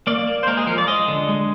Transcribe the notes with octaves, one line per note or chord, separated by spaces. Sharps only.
A#3 D5
A#3
C5
G#3 A#4
G#4
F3 A#4
D5
G#3 D#5
D3
G#3